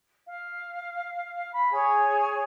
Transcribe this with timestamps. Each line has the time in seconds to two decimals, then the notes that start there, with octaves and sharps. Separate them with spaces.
0.27 F5
1.52 B5
1.72 G#4 C#5 G#5